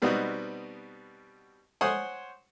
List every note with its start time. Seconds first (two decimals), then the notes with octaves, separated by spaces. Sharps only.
0.02 B2 G3 B3 C4 D#4 F#4
1.81 C5 C#5 F#5 G#5 C6 D#6